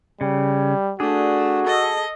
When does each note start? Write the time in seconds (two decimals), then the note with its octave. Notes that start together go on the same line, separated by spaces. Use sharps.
0.21 C#3 G3
1.00 A3 D4 F#4 G#4
1.67 A4 D#5